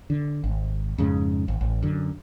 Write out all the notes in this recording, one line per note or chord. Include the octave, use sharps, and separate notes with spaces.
D3
G#1
F2 G#2 C#3
G#1
A1
F#2 D3